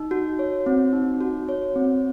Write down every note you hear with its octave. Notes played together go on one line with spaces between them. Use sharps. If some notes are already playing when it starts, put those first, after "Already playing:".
Already playing: D#4
F#4
C#5
C4
D#4
F#4
C#5
C4